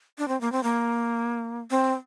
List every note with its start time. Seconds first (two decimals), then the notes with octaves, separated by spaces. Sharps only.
0.18 D4
0.28 C4
0.41 A#3
0.52 C4
0.63 A#3
1.71 C4